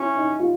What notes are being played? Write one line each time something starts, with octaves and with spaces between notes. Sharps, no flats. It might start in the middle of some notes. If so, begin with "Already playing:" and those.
Already playing: C#4 E4
D#4
F4